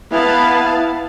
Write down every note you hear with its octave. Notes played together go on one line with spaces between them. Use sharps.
B3 E4 F5 A5